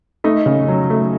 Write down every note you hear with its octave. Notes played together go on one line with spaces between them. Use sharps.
A3 D#4
C#3
F#3
A3